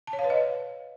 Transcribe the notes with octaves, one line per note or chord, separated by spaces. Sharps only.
A5
C#5
F5
B4
D#5